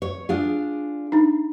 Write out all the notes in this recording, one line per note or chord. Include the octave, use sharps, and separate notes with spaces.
C#5
D4 F4 G#4
D4 D#4